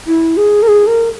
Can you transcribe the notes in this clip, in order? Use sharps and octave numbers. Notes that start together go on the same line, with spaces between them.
E4
G#4
A#4
G#4
A#4